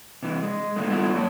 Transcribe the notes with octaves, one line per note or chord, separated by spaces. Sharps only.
C3 E3
G#3
A#2 D3 D#3 G#3 A3
G3 B3 E4 F4 A4
F#2 A#3 C#5 A5